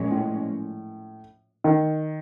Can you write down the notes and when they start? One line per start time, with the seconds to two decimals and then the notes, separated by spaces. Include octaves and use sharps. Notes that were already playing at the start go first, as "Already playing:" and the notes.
Already playing: A#2 F3 G#3 C#4
0.11 A2
1.64 D#3